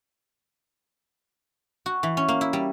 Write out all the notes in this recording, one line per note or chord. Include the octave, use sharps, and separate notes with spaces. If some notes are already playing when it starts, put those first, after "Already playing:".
F#4
E3
C#4
A#3
E4
G3